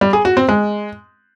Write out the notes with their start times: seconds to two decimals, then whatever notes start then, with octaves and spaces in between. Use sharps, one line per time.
0.01 G3
0.13 G#4
0.25 F#4
0.37 C4
0.48 G#3